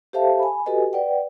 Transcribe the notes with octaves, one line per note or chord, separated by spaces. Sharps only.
G4 A4 C5 E5 F5 A5
G#5 B5
F#4 G4 A4 B4 D#5 G#5
B4 D5 F#5 G5